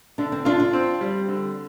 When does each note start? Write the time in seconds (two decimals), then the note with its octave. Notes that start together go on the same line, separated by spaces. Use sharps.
0.18 D3 D4
0.32 C4
0.45 D4 F4
0.60 D4
0.73 C4
1.01 G3
1.28 D3